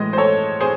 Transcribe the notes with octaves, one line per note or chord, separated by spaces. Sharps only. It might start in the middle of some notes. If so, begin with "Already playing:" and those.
Already playing: A2 E3 G#3 D#5
C5
A4 C#5
G#4 C5